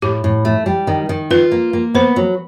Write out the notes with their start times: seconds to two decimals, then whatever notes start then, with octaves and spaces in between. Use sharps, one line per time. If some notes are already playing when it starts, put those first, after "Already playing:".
0.02 A2 G4
0.24 A2
0.45 A3
0.66 G3
0.87 D#3
1.09 D#3
1.30 F4 B4
1.52 A#3
1.73 A#3
1.94 B3 C5
2.16 F#3